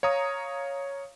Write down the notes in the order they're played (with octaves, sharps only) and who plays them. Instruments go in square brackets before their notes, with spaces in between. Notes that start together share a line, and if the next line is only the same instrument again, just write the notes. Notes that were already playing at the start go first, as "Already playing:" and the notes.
[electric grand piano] C#5 F5 A#5 D#6